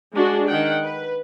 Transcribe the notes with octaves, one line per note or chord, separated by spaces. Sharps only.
G#3 D4 F#4 G#4
D#3 F#5 G5
B4